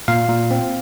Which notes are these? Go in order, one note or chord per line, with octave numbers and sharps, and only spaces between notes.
A#2 F5
A#2
C4